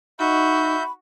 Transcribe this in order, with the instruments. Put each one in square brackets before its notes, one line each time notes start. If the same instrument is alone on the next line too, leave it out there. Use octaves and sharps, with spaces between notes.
[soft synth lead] D#4 [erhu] F#4 [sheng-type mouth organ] E5 G6 [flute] B5